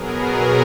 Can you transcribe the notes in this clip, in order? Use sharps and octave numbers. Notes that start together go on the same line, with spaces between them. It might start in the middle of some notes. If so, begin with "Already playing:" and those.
Already playing: B2 F#3 B3 G#4 A#4